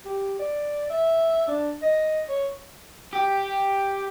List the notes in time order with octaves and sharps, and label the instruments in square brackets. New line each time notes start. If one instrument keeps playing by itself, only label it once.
[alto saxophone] G4
D5
E5
D4
D#5
C#5
[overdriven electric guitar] G4